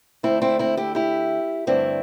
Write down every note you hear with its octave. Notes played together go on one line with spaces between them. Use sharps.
D2 D3 A3 C4 E4
C4 E4
C4 E4
E4 G4
E4 G4
G2 D3 A3 C4 E4